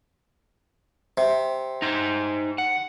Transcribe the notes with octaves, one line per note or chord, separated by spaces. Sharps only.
C3
D#4 C5
F#5